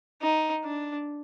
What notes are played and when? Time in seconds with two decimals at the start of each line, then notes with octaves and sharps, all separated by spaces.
0.22 D#4
0.64 D4